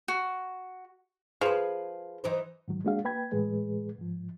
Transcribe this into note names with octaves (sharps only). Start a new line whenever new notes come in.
F#4
F3 G#4 B4
E3 D#4 C5
G#2 D#3 F#3
G#3 A#3 D4 F#4 G#4 F5
A#3 B4 G5 B5 G#6
A2 E3 G#3 G#4 B4
G#2 F3